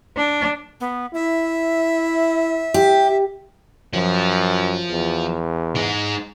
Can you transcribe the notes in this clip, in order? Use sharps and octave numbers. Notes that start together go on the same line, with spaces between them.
D4
B3
E4 E5
G4
F#2 F3
E2
G#3 D#4